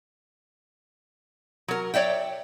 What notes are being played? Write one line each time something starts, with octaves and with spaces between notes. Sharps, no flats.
F#3 A#4
C#5 D5 E5 G5